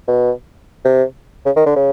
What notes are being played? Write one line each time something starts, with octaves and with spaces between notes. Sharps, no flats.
B2
C3
C#3
D#3
D3
C#3